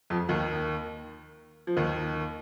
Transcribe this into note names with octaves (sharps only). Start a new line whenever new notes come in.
F2 F3
D#2 D#3
F3
D#2 D#3